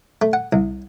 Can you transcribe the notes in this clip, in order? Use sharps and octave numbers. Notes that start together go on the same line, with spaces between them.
A3
F#5
C2